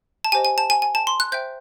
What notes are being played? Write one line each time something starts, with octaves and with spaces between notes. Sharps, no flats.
A5
G4 C5 D#5 G#5
G#5
A5
G#5
G#5
A5
C6
F#6
C5 E5 G5 G6